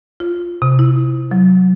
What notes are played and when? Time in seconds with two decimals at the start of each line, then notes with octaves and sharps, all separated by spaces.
0.20 F4
0.62 C3
0.79 E4
1.31 F#3